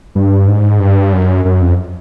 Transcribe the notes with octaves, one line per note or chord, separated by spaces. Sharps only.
G2
G#2
G2
F#2
F#2
F2